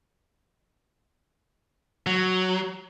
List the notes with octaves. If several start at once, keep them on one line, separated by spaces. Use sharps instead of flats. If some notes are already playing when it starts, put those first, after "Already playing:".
F#3